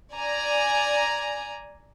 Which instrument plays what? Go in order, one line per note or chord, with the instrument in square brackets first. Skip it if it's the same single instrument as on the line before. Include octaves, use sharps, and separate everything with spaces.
[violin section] D5 G#5 A#5